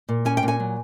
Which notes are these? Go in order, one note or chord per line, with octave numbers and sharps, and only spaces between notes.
A#2
C#4 G#5
G5
A#2
G#5
F#3